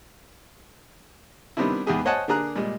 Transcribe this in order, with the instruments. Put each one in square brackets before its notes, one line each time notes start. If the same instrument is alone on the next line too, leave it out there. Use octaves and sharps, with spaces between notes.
[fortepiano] D#3 G3 B3 C4 D4 E4
E2 G#2 B3 G4 G#4 G#5
C5 C#5 D#5 F#5 G#5 A5
D3 A#3 D4 G#4 A#5 F#6
A#2 G3 G#3